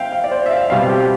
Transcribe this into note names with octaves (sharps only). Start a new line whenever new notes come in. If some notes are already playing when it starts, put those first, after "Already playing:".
Already playing: C5 E5 F5 G5
F5
D5
C5
E5
F5
B2 G3 C4 F5
G4
G4